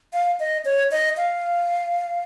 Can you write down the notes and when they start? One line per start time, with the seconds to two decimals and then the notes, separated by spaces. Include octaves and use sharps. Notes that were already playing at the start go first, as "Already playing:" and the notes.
0.13 F5
0.40 D#5
0.65 C#5
0.91 D#5
1.17 F5